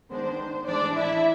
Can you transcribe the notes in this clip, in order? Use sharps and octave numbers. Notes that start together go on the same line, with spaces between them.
D#3 G#3 B3 D4 C5
A2 E3 G#3 D4 D5
E4 E5